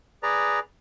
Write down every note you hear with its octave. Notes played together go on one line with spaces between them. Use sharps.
G#4 B4 D5 A#5